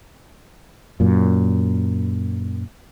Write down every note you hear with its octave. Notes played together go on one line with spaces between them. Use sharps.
F#2 A#2